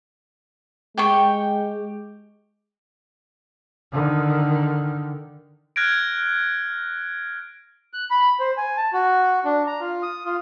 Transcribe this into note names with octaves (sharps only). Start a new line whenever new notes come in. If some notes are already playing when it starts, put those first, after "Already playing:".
G#3 G4 G5 C#6
D3 D#3
F6 F#6 G#6 A#6 D7
F#6
B5
C5
G#5
A5
F#4
D4
A#5
F4
D#6
F4